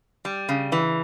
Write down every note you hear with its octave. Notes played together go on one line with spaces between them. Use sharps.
G3
C#3
E3